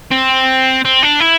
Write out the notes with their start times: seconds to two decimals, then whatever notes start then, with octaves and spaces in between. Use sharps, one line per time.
0.12 C4
0.85 C4
1.03 D4
1.20 E4